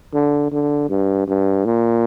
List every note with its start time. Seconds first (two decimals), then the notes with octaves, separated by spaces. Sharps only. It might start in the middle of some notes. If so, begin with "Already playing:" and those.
0.14 D3
0.52 D3
0.90 G2
1.27 G2
1.65 A#2